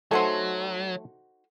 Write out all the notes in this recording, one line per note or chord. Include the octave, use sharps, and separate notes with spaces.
F#3 A3 D#4 F#4 A4 C5 G#5